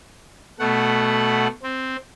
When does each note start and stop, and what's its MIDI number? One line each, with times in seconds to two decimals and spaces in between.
0.59 1.47 47
0.59 1.47 57
0.59 1.47 78
1.63 1.96 60